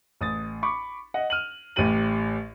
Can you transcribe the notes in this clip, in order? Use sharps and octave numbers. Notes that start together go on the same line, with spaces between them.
A1 D#6 A6
B5 C#6 D6
D#5 F#5
F6 D#7 F#7
A1 A2 G4 D#7 F#7